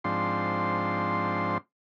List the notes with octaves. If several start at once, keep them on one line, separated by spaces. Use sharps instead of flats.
G#2 F3 C4 D4 C6